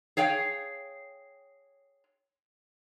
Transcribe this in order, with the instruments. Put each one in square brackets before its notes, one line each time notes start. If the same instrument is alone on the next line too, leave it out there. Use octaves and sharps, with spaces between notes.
[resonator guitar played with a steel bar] G#4 C#5 F5 G5